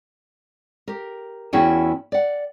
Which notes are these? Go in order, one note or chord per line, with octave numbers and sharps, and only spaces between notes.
G4 A#4
E2 C#4 E4 F#4 G#4 G5
D5 F#5